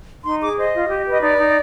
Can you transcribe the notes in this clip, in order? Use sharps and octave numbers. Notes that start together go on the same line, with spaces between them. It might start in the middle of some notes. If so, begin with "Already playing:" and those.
D#4 C6
G#4 D6
C5 D#5
F4
G4
B4 D#5
D#4 D5
D#4